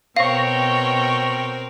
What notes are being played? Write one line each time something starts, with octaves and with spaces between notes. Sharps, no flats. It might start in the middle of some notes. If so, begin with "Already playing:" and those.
B2 C4 A#4 C#5 F5 G5 C#6 A#6